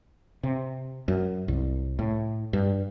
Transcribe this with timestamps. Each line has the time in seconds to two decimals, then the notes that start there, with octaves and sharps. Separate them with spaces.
0.43 C3
1.08 F#2
1.48 C2
1.99 A2
2.53 G2